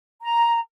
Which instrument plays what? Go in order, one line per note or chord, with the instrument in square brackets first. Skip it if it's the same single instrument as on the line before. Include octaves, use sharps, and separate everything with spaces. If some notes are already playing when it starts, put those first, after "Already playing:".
[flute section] A#5